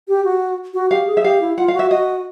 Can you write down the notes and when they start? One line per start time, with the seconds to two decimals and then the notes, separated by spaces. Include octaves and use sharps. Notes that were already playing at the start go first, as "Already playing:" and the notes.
0.08 G4
0.25 F#4
0.74 F#4
0.90 G4 F5
1.07 G#4
1.17 E5
1.24 G4 F5
1.41 E4
1.57 F4 F#5
1.68 F5
1.74 F#4 E5
1.91 F#4 D#5